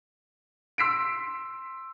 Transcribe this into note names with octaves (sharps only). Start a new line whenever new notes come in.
C6 E6 B6 C7 D7